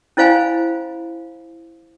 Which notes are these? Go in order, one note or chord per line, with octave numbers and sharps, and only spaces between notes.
C#4 E4 C5 F5 G#5 B5